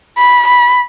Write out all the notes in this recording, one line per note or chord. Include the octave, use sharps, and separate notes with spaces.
B5
B5